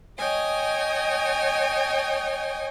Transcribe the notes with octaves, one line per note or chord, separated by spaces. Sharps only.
C#5 D#5 G5 G#5 D#6